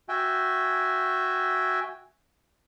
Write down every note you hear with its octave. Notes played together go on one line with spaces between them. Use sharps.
F#4 E5 G5 G#5